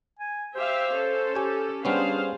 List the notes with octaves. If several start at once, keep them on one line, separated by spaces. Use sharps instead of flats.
G#5
G4 C5 E5 F5
C#4 A4
G4 C#5 G#5
G3 B3 C#4 D4 G#4 C5 F5